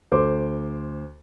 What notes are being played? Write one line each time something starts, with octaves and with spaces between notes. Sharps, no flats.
D2 C5 D6